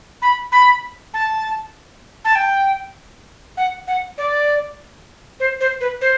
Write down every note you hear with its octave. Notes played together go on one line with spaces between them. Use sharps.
B5
B5
A5
A5
G5
F#5
F#5
D5
C5
C5
B4
C5